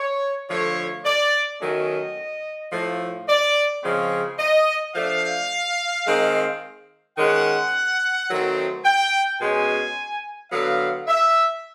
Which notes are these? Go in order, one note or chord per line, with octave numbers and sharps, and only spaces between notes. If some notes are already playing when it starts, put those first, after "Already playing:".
Already playing: C#5
D3 F3 A3 C#5
D5
D#3 F#3 A3 C#4 D#5
A2 F3 A3
D5
C#3 F3 G#3 C4 C#5
D#5
F3 A3 D4 F5
D#3 G#3 C4 D#4
D#3 G#3 C#4 F#5
D#3 F#3 A3 C4
G5
B2 G#3 C#4 G#5
D3 F#3 B3 F5
E5